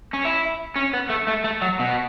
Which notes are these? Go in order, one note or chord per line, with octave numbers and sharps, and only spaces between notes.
C#4
E4
C#4
B3
A3
A3
A3
F#3
B2